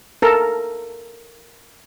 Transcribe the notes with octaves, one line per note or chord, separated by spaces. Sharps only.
A4 A#4